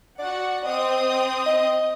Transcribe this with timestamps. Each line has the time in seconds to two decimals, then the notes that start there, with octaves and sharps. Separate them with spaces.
0.19 F#4 D5 F#5
0.64 C4 D#5 D#6
1.46 D#5